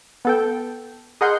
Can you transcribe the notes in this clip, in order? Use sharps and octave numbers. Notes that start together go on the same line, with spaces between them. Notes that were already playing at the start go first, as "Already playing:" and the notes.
B3 A4 G5
G#4 A#4 D#5 F#5 C6 G6